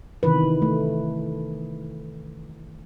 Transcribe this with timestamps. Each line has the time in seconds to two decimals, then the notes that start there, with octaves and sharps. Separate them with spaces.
0.23 C3 D#3 E3 B4
0.62 A3